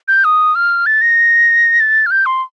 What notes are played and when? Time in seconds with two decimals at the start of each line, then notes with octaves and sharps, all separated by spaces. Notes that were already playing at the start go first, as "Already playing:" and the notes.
0.08 G6
0.24 D#6
0.55 F6
0.86 A6
1.02 A#6
1.80 A6
2.06 F6
2.11 G6
2.26 C6